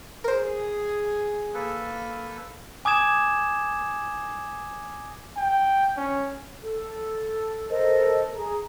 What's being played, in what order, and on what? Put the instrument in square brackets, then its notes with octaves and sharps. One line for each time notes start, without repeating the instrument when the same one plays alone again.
[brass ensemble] G#4 [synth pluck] A#4 C5
[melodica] A#3 A4 B4
[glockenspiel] G#5 D6 D#6 G#6 E7
[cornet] G5
C#4
[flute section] A4
A4 A#4 C5 D#5
G#4 A#5